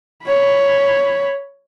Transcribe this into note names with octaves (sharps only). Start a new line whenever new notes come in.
C#5 B5